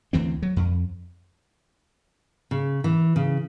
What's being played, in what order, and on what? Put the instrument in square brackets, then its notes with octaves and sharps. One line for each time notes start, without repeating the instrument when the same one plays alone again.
[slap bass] D2 E3 C4
F#3
F2
[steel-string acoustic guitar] C#3
E3
C#3